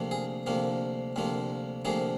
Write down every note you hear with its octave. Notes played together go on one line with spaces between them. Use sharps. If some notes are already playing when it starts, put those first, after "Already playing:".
Already playing: D2 C3 F3 A#3
G#4
D2 C3 F3 A#3
D2 C3 F3 A#3
D2 C3 F3 A#3 G#4